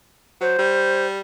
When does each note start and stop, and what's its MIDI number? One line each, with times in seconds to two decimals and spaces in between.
0.41 0.58 54
0.41 1.07 72
0.59 1.20 55